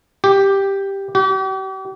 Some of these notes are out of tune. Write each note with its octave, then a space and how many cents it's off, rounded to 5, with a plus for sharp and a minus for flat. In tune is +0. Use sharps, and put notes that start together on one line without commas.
G4 +5
G4 -40